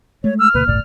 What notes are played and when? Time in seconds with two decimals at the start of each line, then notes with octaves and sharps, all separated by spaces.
0.24 G#3 A3 C#5
0.39 E6 F6
0.54 D2 B2 A#3 B4
0.67 G1 C#2 A2 D5